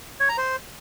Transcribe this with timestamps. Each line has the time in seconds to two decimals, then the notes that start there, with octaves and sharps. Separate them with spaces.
0.20 C#5
0.29 A#5
0.38 C5